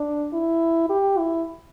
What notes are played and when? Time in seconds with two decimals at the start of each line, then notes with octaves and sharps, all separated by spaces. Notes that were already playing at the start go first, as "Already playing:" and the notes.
Already playing: D4
0.33 E4
0.90 G4
1.18 E4